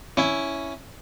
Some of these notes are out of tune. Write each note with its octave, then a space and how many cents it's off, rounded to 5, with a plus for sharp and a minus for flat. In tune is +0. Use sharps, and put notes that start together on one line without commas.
C#4 +5 E4 +0